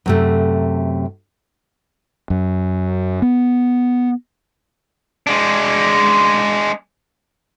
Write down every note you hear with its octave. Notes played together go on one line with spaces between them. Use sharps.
F#2 C3 A3
F#2
B3
G#3 D4